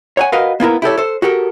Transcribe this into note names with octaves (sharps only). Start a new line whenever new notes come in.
C#5 F#5 G#5
F#4 A#4 B4 D#5 F5
A#3 B3 E4 A#4
E4 G4 A4 C#5
A4 C5
F#4 G4 A4 A#4